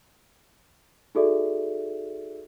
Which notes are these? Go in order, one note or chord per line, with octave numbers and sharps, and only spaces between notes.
D#4 F#4 G#4 A4 D5 E5